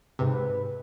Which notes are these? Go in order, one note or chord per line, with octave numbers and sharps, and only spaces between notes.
G#2 C3 B4